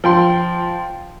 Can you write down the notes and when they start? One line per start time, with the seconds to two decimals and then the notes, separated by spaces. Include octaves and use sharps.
0.04 F3 G5 C6